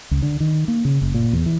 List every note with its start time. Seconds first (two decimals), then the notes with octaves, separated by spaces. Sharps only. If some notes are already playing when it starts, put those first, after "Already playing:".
0.11 C#2
0.22 D3
0.40 D#3
0.68 A#3
0.85 C#3
1.02 F#1
1.14 A#2
1.33 E2
1.46 E3